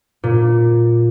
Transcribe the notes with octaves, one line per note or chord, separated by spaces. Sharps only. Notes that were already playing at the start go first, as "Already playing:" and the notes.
A#2